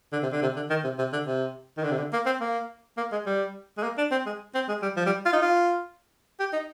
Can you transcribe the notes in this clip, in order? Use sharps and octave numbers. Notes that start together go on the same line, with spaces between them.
D3
C3
D3
C3
D3
D#3
C3
C3
D3
C3
D#3
D3
C3
D3
A#3
C4
A#3
A#3
G#3
G3
G#3
A#3
D4
C4
G#3
C4
G#3
G3
F3
G3
F4
D#4
F4
G4
D#4